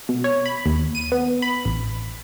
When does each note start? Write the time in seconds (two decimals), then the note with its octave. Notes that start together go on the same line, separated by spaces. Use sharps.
0.09 B2
0.24 C#5
0.46 B5
0.66 D#2
0.95 D#7
1.12 B3
1.42 B5
1.65 A1